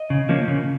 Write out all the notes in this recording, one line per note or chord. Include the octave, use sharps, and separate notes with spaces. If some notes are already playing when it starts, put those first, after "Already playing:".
Already playing: D#5
C#3
F3 A#3 C#4
C#3